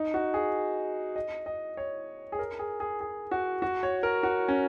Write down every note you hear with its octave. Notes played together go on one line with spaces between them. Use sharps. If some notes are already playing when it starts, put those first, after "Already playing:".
Already playing: D#4
F#4
G#4
D#5
D#5
C#5
G#4
A#4
G#4
G#4
G#4
F#4
F#4
C#5
A#4
F#4
C#4